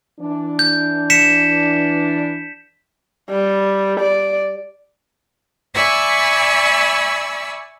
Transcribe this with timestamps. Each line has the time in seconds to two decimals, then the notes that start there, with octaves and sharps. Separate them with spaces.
0.20 E3 D4
0.59 G6
1.10 B6 C#7 E7
3.30 G3
4.00 D5
5.75 D5 E5 G#5 B5 C#6 E6